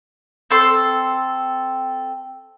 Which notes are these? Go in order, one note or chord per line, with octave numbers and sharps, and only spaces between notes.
C4 A4 C6